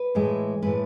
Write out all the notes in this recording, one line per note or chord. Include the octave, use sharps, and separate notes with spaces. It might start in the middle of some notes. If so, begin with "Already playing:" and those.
Already playing: B4
A2 E3 G#3
A2 E3 G#3 B4